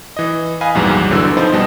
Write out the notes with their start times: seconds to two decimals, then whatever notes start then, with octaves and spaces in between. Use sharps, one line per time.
0.17 E3 D#5
0.61 B4 D#5 F5 G#5
0.75 A#1 E2 G#2 F#3 G3
1.11 G1 D3 E3 F#4 E6
1.37 F3 C4 D#4 A4 B4 C5
1.52 B1 B2 G3 D#5 A5